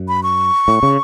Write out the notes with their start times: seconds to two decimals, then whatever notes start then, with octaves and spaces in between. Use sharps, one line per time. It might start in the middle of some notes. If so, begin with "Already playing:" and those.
Already playing: F#2
0.08 B5
0.23 C#6
0.68 A2
0.83 C#3